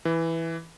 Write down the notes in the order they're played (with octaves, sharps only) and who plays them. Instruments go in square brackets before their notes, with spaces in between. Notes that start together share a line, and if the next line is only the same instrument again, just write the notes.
[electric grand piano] E3